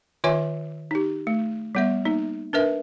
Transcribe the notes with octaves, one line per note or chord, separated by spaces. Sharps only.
D#3 F4 C#5 E5 G#5 D6
D#4 G4
A3
G3 B3 E5
A#3 D#4
D4 A#4 B4 E5